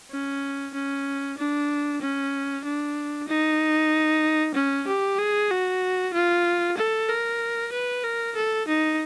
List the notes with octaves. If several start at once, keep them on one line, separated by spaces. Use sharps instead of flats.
C#4
C#4
D4
C#4
D4
D#4
C#4
G4
G#4
F#4
F4
A4
A#4
B4
A#4
A4
D#4